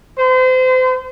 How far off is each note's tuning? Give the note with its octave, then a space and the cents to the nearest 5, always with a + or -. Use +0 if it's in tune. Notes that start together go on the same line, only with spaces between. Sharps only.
C5 -35